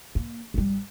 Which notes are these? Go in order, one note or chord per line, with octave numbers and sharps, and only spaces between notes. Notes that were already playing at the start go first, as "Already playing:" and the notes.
A#3
G#1 G3